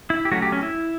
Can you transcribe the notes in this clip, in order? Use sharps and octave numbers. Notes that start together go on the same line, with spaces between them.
E4
G4
F#3 A3 C#4 F#4
G4
C#4
E4